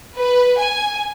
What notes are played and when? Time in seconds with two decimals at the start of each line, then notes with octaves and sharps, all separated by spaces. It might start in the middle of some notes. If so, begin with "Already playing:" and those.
0.16 B4
0.59 G#5